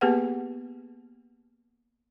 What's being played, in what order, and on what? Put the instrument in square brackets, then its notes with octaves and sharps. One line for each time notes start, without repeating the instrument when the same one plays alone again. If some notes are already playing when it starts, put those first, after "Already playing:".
[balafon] A#3 B3 G4 G#4 B4 F#5